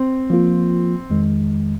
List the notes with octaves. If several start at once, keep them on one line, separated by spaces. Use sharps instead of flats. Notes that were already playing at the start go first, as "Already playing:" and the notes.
Already playing: C4
F3 A#3 F4
F2 D#3 G#3